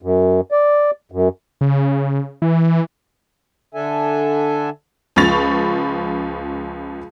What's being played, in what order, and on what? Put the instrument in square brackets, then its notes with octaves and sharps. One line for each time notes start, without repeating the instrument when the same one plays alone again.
[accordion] F#2
D5
F#2
[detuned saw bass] C#3
E3
[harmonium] D3 D4 A4 E5 G#5
[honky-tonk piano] C#2 F3 B5 C#6 A6 F7